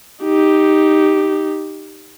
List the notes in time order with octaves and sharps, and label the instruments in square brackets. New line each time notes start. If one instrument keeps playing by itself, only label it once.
[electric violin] D#4 G4